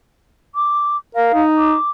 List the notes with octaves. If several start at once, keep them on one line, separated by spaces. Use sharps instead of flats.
D6
A#4 F5
D#4
D6